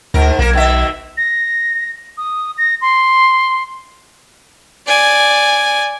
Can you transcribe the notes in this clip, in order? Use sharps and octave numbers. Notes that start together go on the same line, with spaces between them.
D2 G#2 A#4
B1 A#3 A#4
B2 D#3 E5
A#6
D#6
A#6
C6
D5 G#5